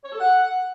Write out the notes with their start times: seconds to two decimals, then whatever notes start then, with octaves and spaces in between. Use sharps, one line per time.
0.04 C#5
0.12 A4
0.20 F#5